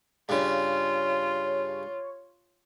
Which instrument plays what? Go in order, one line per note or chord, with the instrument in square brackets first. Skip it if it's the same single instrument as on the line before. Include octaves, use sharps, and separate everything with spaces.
[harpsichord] G2 C#3 [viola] F4 [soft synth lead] C#5